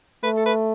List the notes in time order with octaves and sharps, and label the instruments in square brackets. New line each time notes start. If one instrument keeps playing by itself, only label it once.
[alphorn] A3 [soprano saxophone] B4
[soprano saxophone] A4
B4